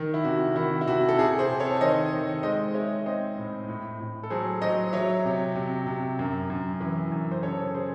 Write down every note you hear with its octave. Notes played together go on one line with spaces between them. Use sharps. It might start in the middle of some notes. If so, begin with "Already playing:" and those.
Already playing: D#3
E4
C3 F#4
D#3 E4
E4
C3 F#4
A4
C3 E4 G#4
G#4 C5
C3
A4 C#5
C#5
D#3 C5 D#5
D#3
G#3 C5 D#5
G#3 C#5 E5
C4 C5 D#5
A2
A2
A2
A4
F#3 G#4 C5
F#3 C5 D#5
F#3 C#5 E5
C3
C3
C3
F#2
F#2
E3
F#2
C5
C#3 A4 C#5
G#4 C5